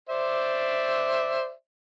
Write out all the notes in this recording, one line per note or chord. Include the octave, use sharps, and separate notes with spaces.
C5 D5 E5